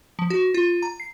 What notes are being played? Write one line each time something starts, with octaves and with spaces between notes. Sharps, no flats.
F3
F#4
F4
A#5
C7